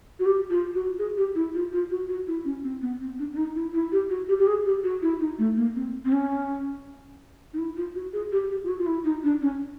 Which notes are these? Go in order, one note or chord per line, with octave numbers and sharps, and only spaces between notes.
F#4
G4
F4
F#4
G#4
G4
E4
F4
F4
F#4
F#4
E4
C#4
C4
B3
C4
D4
D4
D#4
E4
E4
G4
F#4
G4
G4
G#4
G4
F#4
E4
D#4
A3
A#3
C4
C4
C#4
D#4
E4
F4
F#4
G#4
G4
G4
F4
F#4
F4
E4
D#4
D4
C#4